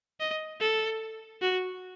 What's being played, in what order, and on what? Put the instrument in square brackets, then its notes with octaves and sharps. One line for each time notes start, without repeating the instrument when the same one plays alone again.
[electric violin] D#5
A4
F#4